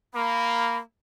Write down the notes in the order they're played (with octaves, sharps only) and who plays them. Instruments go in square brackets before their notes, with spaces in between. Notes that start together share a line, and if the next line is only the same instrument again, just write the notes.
[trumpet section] A#3 [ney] B5